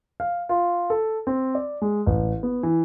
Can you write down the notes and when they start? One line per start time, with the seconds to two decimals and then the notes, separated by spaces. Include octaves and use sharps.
0.20 F5
0.49 F4
0.90 A4
1.27 C4
1.55 D5
1.82 G#3
2.06 A1
2.43 B3
2.63 E3